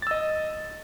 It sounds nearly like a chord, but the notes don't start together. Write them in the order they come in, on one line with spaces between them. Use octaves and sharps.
A6 E6 D#5